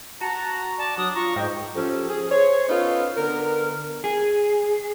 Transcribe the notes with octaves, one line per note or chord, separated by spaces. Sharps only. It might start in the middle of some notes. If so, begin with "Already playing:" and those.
F#4 A5 A#5
D5 A5
F#3 D4 D#6
F4 A#5 C#6
G#2 D#5 G5
F3 C#4 G4 A4
G#4
C5 C#5
B3 C#4 D#4 F4 A4
D3 B3 A#4
G#4